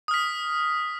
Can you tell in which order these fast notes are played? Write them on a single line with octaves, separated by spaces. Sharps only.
D#6 F6 B6